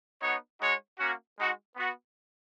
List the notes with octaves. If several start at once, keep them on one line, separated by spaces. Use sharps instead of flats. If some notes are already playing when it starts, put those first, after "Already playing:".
B3 D#4 F#4 C#5
G#3 D#4 F#4 C#5
A#3 C#4 F#4
G#3 D#4 F#4
B3 F#4